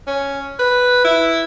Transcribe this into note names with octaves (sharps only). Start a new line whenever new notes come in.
C#4
B4
E4